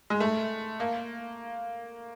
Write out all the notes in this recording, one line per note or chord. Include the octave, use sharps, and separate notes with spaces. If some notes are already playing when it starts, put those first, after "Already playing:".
G#3
A3
A#3